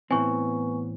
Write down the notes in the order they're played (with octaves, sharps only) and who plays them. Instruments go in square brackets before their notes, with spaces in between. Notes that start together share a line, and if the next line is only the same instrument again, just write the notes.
[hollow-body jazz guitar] A2 E3 C4 [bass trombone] B3 [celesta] G#5 C#6